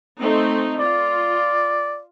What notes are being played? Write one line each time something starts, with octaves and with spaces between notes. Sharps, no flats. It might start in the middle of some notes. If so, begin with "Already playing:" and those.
A3 C4 D#4
F4 D5